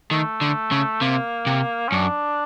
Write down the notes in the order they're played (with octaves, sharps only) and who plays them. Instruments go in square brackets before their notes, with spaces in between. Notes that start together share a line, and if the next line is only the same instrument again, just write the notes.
[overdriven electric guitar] D#3 [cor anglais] A3
[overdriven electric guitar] D3
C#3
[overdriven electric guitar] C3 [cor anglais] A#3
[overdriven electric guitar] C3
[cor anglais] C#4
[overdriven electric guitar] F#2 [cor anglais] D4